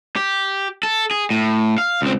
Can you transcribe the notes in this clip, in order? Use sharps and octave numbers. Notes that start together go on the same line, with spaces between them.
G4
A4
G#4
A2
F5
C#2 C4